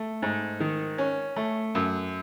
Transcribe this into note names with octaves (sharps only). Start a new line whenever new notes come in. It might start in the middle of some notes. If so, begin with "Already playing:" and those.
Already playing: A3
G#2
D#3
C#4
A3
F#2